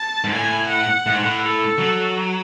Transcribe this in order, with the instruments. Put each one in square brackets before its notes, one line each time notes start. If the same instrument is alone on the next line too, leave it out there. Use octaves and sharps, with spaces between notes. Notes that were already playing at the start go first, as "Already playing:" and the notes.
Already playing: [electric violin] A5
[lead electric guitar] G#2
[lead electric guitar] A2 [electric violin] G#5
[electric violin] F#5
[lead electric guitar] A2
G#2
A2
[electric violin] A4
[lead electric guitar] F#3